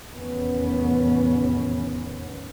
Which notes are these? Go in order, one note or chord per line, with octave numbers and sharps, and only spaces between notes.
F1 E2 A2 D#3 B3 C#4